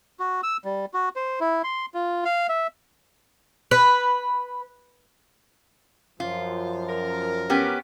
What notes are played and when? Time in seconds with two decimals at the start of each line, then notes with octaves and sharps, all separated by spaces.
0.20 F#4
0.43 E6
0.65 G3
0.94 F#4
1.16 C5
1.40 E4
1.64 C6
1.94 F4
2.25 F5
2.49 E5
3.71 B4
6.20 F#2 F3 F4
6.88 A#4
7.50 B3 C#4 G4